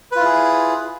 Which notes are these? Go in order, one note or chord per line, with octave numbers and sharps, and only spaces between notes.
E4 F4 G#4 B4